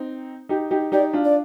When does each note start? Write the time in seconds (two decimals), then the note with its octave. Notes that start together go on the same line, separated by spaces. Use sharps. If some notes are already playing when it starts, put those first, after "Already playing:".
Already playing: C4 D#4
0.49 D#4 G4
0.71 D#4 G4
0.92 D#4 G4 D5
1.13 D4 F4
1.25 D5